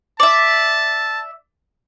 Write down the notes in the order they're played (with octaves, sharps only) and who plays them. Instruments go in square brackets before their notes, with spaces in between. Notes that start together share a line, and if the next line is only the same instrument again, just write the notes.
[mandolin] D5 E5 [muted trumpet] A5